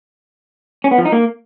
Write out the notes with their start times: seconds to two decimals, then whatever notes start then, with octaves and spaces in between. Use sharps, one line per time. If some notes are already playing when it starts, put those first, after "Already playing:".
0.84 C#4
0.91 B3
0.98 F3
1.05 D#4
1.12 A#3